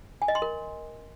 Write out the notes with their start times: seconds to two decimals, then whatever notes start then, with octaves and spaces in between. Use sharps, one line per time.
0.22 G#5
0.28 D#5
0.35 C6
0.42 A#4